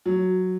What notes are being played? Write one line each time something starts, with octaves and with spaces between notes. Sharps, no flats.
F#3